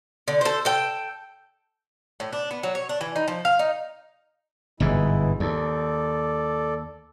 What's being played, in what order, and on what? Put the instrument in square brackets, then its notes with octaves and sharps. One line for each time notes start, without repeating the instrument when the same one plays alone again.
[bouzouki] D3
A4 C5
A4 G5
A2
D4
B3
F#3
C#5
D4
E3
D#4
F3
F5
D#4
[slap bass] G1 G#2 E3 [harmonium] B2 G#3 E4
[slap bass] D#2 [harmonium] A4 D5